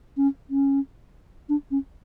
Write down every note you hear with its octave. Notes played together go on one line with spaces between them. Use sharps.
C#4
C#4
D4
C#4